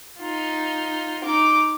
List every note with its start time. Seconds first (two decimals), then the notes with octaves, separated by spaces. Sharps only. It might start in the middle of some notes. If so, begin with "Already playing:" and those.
0.19 D#4 F4
1.24 D#4 D6